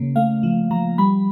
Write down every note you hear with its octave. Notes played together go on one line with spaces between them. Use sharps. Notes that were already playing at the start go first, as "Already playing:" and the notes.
Already playing: C#3 A#3
A3 F5
F3
F3 A#5
G3 B5